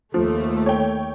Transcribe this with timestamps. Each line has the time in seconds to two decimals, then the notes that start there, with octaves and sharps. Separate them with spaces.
0.14 D#2 F3 A3
0.66 C#5 G5